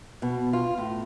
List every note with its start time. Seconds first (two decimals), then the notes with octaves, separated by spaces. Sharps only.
0.22 B2
0.53 F4
0.78 A2